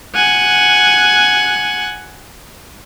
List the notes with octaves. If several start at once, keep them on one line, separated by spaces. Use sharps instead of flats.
F#5 G#5